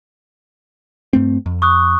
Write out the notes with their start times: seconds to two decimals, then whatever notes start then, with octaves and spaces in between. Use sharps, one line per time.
1.13 G2 A3 C4
1.46 F2
1.62 C#6 D#6 F#6